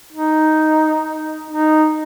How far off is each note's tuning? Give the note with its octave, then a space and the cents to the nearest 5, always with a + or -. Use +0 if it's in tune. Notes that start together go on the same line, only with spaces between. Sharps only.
D#4 +0
D#4 -10